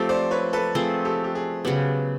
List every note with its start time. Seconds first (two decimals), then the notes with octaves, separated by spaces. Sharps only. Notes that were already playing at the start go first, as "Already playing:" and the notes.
Already playing: F3 A3 C4 G4 A4
0.09 C5 D5
0.31 B4 C#5
0.53 A4 B4
0.75 F3 A3 C4 G#4
1.05 G4 A4
1.24 G4
1.35 G#4
1.65 C#3 F#3 B3 G4